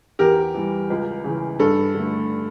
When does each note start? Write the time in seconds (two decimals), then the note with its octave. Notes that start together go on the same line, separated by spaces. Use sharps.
0.19 E2 G4 A#4
0.54 E3 G3
0.90 C#2
1.24 C#3 E3
1.59 G2 A4
1.94 D3
1.99 A3